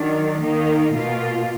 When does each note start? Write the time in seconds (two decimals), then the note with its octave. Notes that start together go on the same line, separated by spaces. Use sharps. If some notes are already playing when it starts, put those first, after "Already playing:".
Already playing: D#3 F#3 D4
0.39 D#3 A#3 D#4
0.93 B2 A#3 F4